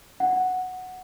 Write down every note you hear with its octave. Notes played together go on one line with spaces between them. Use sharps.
F#5